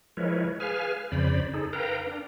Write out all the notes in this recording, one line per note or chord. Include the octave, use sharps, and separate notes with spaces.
F3 G#3 E4 A#4 B4 C#5
G#4 B4 F5 G#5 F6
F2 C#3 C5 D5 B5
D#4 G#4 A4
A#4 B4 F5 G5 A#5
D4